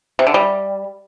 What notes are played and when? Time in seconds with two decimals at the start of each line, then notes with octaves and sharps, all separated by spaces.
0.19 C3
0.27 D3
0.34 G3